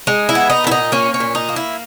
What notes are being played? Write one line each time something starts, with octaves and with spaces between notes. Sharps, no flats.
G#3 D#4
E4
B3
D#4
A#2 E4
D#4
A#3 C#4
C#4
A#2
D#4
A#3
E4